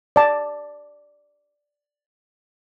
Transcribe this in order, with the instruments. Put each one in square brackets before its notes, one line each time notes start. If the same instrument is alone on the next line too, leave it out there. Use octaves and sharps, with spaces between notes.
[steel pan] D5 A5